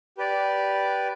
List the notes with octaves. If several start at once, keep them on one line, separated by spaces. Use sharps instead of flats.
G4 B4 D5